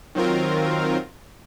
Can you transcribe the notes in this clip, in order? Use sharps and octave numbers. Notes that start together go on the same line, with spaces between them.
D#3 F#3 C4 F4 A#4